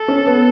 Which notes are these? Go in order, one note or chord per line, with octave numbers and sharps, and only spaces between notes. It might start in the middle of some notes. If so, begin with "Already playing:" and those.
Already playing: A4
C#4
B3